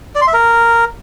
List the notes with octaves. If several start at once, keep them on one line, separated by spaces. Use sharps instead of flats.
D5
C6
E5
A#4